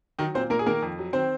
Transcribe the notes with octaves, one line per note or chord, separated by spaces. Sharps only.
D#3 F#3 D#4
A#2 C4 C5
A#2 A#3 A#4
G#4
D#3 A#3 A#4
F2
F#3
D#3 C4 C5